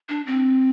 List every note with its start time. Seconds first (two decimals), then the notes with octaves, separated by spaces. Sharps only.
0.09 D4
0.26 C4